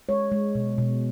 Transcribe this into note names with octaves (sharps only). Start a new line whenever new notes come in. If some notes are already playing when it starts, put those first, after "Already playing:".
G#3 C#5
G#3
B2
B2